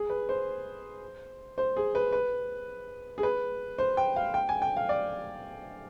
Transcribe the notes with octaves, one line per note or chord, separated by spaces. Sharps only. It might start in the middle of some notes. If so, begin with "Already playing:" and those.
Already playing: G#4
B4
C5
C5
G#4
B4
B4
G#4
B4
C5
G5
F5
G5
G#5
G5
F5
D5